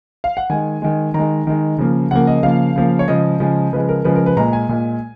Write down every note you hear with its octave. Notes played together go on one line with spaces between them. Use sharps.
F5
F#5
D#3 G#3 G#5
D#3 G#3
D#3 G#3 A#5
D#3 G#3
C#3 F3 A#3
C#3 F3 A#3 F#5
D#5
C#3 F3 A#3 F5
C#3 F3 A#3
C#5
C#3 F3 G#3 D#5
C#3 F3 G#3
C#3 F3 G#3 B4
A#4
C#3 F3 G#3 B4
A#4
B4
A#2 G#3 A#5
G#5
A#2 G#3